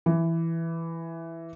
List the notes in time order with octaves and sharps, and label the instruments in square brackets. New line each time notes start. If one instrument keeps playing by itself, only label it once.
[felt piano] E3